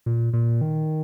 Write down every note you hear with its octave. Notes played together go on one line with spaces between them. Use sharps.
A#2
A#2
D#3